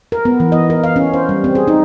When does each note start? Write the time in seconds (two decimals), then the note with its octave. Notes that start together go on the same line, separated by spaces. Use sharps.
0.12 A#4
0.25 B3
0.40 E3
0.52 D#5
0.70 A#4
0.84 F5
0.96 C#4
1.14 C5
1.29 G3
1.44 C4
1.55 G#4
1.68 D#4